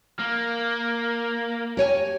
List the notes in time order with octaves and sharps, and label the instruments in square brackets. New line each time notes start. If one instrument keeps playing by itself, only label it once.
[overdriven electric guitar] A#3
[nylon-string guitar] G4 C#5 G#5